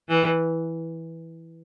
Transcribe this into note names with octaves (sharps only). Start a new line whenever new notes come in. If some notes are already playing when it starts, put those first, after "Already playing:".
E3